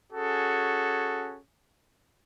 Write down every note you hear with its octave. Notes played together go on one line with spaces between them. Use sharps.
C#4 F#4 G#4 A4